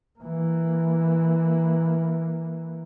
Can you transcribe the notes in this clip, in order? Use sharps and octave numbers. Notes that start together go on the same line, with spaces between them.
E3 A#3